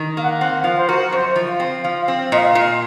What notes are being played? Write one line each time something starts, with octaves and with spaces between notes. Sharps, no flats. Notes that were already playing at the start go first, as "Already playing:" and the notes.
Already playing: D#3
A#3 F5
F#5
C4 F#5
F#5
F3 F5
C5
F#4 A#4
F#2 C5
F3
F5
C4
F3 F5
F5
C4
A#2 D#5
F5
A#2